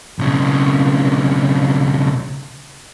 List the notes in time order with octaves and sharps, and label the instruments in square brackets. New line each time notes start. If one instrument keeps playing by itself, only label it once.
[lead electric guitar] B1 C#3